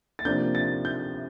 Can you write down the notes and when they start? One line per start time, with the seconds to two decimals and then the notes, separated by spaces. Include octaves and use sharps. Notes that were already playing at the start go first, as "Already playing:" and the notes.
0.19 A6
0.25 C3 F3 A#3 D4 G6
0.55 A6
0.85 G6